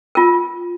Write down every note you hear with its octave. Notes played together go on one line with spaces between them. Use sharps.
F4 A#4